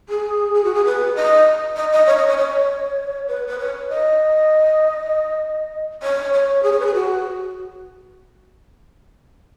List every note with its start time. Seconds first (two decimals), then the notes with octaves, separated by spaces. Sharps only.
0.09 G#4
0.54 G#4
0.64 F#4
0.74 G#4
0.85 B4
1.16 D#5
1.76 D#5
1.93 D#5
2.06 C#5
2.17 D#5
2.27 C#5
2.38 C#5
3.28 B4
3.48 B4
3.59 C#5
3.89 D#5
6.03 C#5
6.33 C#5
6.63 G#4
6.72 C#5
6.79 B4
6.86 G#4
6.94 F#4